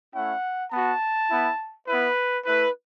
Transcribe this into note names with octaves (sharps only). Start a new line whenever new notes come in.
A3 C#4 E4 F#5
B3 F#4 A5
B3 E4
B3 E4 B4
A3 E4 B4